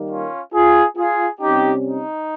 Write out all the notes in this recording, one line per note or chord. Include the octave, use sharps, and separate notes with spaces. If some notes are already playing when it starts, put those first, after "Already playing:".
Already playing: D#2 D#3 G3 A#3
C#4 F4
F4 G#4
F4 G#4
C3 G3 C#4 D#4 G4
D#4